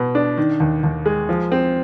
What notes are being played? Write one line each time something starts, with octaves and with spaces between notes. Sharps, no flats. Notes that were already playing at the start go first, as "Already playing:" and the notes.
Already playing: B2
D4
D#3
D#2
D#2
G#3
F3
C4